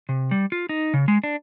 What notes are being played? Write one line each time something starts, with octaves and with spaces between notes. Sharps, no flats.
C3
G3
F4
D#4
C#3
G#3
D4